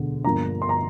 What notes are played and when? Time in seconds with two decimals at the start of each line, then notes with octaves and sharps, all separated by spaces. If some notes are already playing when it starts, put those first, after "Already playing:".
Already playing: E1 D2 D3
0.25 G1 G2 F3 A#3 D4 A#5
0.62 C6
0.69 A#5